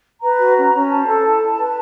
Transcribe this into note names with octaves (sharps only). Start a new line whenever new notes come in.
B4 A#5
F#4
C#4
C#4
C5 A5
A4
E4
E4
B4